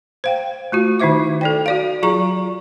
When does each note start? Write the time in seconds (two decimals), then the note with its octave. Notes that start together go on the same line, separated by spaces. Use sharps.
0.24 C5 F5 G5
0.72 A3 F4 F#4
1.00 D#3 D#4 E4 C5 E5 D6
1.41 A4 D5 G5
1.66 F#4 D5 F5
2.03 F#3 F4 G#4 D5 A#5 C#6